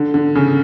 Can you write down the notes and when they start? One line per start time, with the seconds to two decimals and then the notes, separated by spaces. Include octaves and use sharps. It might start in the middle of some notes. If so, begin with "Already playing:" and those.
Already playing: D3
0.14 D3
0.35 C#3